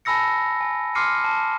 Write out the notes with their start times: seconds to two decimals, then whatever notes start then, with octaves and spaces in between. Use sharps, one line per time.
0.05 G#5 A5 B5 E6 A#6 C#7
0.60 G#5
0.95 C6 D6 F6 C7 C#7 D#7
1.24 A5